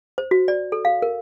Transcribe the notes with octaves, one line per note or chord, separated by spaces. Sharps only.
C5
F#4
D5
A4
F5
A#4